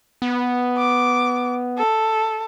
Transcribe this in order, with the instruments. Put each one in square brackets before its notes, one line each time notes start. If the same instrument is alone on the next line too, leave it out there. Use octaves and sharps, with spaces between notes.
[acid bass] B3
[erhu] D6
A4